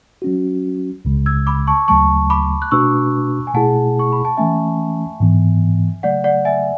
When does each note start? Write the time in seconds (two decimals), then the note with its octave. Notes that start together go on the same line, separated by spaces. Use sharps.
0.22 F#3 C#4 F#4
1.05 C#2 C#3 G#3
1.26 E6 G#6
1.47 B5 D6
1.67 A5 C#6
1.88 D2 C#3 F#3 A3 A5 C#6
2.30 B5 D6
2.62 F#6
2.71 B2 A3 D4 F#4 B4 C#6 E6
3.47 G#5
3.54 B2 A3 E4 G#4 F#5 A5
3.99 C#6
4.12 B5
4.25 A5
4.37 E3 A3 C#4 E5 G#5
5.20 G#2 E3 B3
6.03 C#3 F#3 A3 D5 F#5
6.24 D5 F#5
6.45 E5 G#5